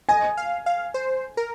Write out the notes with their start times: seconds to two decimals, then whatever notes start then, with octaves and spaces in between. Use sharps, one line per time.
0.09 D#5 G#5
0.37 F5
0.66 F5
0.94 C5
1.37 A#4